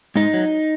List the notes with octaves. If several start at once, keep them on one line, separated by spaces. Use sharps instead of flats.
G#2 D#4
F#3